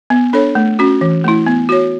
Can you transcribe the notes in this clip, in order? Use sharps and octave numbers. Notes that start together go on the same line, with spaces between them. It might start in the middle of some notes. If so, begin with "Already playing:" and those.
B3
D4 A4 C#5
A3
C#4 F#4
E3
A3 E4
B3
F#4 C#5